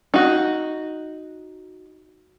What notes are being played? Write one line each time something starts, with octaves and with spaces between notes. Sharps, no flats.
D#4 F#4